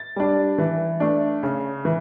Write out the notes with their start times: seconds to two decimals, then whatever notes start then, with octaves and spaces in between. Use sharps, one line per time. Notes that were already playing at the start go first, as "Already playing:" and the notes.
Already playing: A6
0.16 G3 D4
0.58 E3
1.00 A3 D4
1.43 C#3
1.85 E3